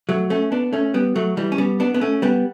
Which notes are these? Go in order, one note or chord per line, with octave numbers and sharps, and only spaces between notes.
F#3 A3
A3 C#4
B3 D4
A3 C#4
G3 B3
F#3 A3
E3 G3
C#4
G3 B3
B3 D4
B3
A3 C#4
G3 B3